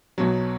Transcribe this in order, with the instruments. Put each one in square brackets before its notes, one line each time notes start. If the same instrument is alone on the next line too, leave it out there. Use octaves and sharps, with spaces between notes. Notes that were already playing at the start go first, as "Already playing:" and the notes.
[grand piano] B1 B2 F#3